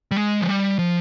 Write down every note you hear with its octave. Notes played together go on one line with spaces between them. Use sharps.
G3
G#3
F3
G3
F3